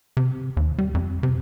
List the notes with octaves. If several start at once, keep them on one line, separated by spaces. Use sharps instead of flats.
C3
D#2
G3
F2
C3